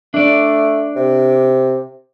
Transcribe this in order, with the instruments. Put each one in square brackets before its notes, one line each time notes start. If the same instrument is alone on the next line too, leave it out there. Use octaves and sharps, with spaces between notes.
[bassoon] A3 [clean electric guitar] D4 D5
[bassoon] C3